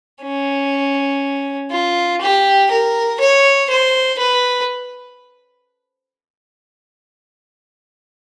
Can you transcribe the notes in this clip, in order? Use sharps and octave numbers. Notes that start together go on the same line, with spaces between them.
C#4
F4
G4
A#4
C#5
C5
B4